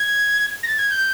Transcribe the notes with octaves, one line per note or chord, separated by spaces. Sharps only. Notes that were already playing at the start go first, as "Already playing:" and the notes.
Already playing: G#6
A#6
A6
G#6
G6